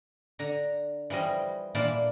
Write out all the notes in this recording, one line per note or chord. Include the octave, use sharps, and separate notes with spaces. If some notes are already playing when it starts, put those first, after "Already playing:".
D3 A#5
E3 F3 G3 D#5
A#2 E3 A#3 D4 A5 B5